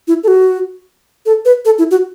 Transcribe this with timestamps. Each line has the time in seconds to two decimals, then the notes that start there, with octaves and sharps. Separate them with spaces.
0.08 E4
0.24 A4
0.28 F#4
1.26 A4
1.45 B4
1.65 A4
1.78 E4
1.91 F#4